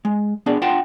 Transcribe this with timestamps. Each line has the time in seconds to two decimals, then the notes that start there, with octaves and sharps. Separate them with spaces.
0.05 G#3
0.46 B3 D4 G#4 D5
0.62 D4 F4 F#5 G5 A5 C6